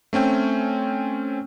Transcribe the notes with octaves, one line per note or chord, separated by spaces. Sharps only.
A3 C4 C#4 G5